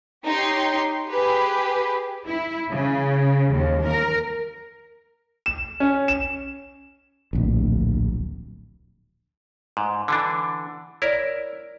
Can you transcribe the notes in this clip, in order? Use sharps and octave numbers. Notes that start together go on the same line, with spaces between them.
D#4 G4 C#5 G5 C6
G4 G#4 B4
E4
C#3
D#2
A#4
E7
C#4
E7
D1 A#1
G#2
D3 E3 D4
E4 A#4 C#5 D5